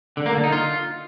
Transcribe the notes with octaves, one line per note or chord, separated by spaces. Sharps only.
D3
A#3
D3
D#4
F4